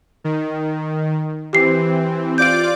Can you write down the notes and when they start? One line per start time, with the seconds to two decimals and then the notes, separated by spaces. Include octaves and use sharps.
0.24 D#3
1.53 E3 C4 G4 C7
2.38 F4 D5 D6 G6 D7